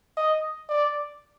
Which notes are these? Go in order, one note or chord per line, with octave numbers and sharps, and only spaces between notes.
D#5
D5